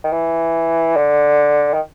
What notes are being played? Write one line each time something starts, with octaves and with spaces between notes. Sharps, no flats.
D#3
E3
D3
D#3